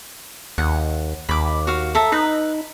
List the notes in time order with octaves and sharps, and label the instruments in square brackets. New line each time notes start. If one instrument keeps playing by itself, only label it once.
[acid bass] D#2 [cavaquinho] F#5
[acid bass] D#2 [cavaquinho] B5 D6
[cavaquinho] F#4 F5
A4 E5 A#5
[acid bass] D#4 [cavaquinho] B4